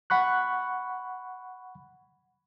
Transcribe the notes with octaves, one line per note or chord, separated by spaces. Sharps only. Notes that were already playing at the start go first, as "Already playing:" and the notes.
F#5 B5 C#6 F#6